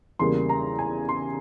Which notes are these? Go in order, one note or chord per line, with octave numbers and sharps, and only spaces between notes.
E2 C#3 G3 A#3 C6
A#5
G#5
C6